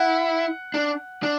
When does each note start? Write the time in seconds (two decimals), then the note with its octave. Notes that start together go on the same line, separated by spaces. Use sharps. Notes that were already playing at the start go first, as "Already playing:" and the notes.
Already playing: E4 F#5
0.74 D4
1.23 D4